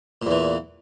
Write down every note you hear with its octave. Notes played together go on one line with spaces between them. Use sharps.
E2 A#2 E3